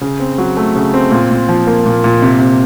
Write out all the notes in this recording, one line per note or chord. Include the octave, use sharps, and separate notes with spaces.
C#3
C4
F#3
A3
C#3
C4
A#2
A#2
F3
A#3
A#2
A#2
C3
C3